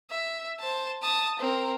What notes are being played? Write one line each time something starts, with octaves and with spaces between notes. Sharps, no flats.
E5
C5 A5
A5 D#6
C4 A#4